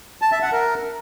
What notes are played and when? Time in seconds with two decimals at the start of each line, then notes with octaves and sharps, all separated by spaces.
0.22 A5
0.32 E5
0.42 F#5
0.53 A#4